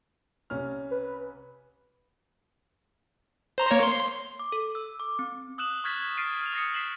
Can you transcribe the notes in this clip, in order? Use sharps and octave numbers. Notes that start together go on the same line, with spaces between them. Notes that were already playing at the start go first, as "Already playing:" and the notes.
C2 C#4 F6
B4
C5 A#5 C6
A#3 C#5
C6
D6
A4
E6
D6
C4
D#6 E6 F#6 E7 F#7
C#6 F6 F#6 G#6 A6 B6
F6 A6 B6 C7 D7 D#7
F6 F7
D#6 A#6 C7 C#7
B6 C7 E7 F#7